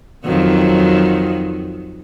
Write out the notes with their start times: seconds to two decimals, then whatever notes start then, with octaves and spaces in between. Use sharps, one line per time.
0.25 F2 D#3 F#3